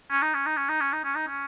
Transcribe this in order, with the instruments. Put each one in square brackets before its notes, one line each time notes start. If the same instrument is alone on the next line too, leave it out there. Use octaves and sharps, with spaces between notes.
[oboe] C#4
D#4
C#4
D#4
C#4
D#4
C#4
D#4
C#4
D#4
C#4